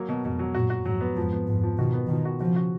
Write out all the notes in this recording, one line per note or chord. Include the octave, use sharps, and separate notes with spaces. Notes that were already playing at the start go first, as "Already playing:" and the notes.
Already playing: F#3 A#3
B2
F2 G#2 B2
F#3
F#2 A#2 F#4
F#4
F2 G#2 F#3
B3
F2 G#2 F3
B3
F2 G#2 F3
F3
B2 D#3 F#4
B3
B2 D#3 F3
F#4
C#3 F3 F#4
F#4